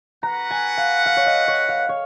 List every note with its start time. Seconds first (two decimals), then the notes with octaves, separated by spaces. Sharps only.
0.22 F#4 B4 F#5 A#5
0.51 G#5
0.77 F5
1.06 F5
1.17 C#5
1.27 D#5
1.48 C#5
1.69 F5
1.89 C#5